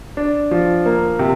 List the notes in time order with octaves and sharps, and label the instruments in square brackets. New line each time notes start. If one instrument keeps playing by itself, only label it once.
[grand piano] D4
F3
A#3
C3